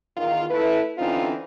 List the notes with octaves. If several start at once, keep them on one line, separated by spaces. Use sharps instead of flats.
E2 D#3 F4
A3 E4 B4
D3 E3 C4 C#4 D#4 F4